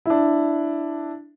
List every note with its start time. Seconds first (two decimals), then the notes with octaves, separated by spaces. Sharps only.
0.06 D4 E4